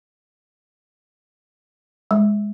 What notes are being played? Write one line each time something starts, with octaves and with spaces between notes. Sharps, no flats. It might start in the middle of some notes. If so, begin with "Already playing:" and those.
G#3